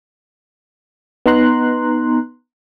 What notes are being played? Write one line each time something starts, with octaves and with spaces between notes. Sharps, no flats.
B3 D#4 A#5 C6 F#6